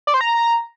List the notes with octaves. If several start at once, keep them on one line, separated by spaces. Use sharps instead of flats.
D5
C5
A#5